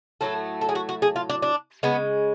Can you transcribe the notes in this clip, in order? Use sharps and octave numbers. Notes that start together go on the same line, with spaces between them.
A2 F#3 A3 A4
A4
G#4
F#4
F#4
G#4
F4
D4
D4
C#3 G#3 B3